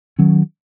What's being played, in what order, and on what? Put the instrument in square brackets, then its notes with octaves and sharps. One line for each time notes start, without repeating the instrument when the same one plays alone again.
[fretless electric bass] D#3 F#3 C#4